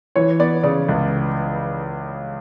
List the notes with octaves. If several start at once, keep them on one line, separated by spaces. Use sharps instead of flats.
E3 C#5
B3 D5
C#3 D5
C#2